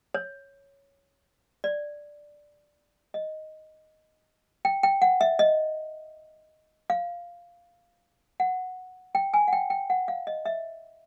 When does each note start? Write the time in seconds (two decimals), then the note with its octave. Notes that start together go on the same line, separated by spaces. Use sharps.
0.14 C#5
1.64 D5
3.14 D#5
4.65 G5
4.83 G5
5.02 F#5
5.21 E5
5.39 D#5
6.90 F5
8.40 F#5
9.15 G5
9.34 G#5
9.48 F#5
9.53 G5
9.70 G5
9.90 F#5
10.08 F5
10.27 D#5
10.45 E5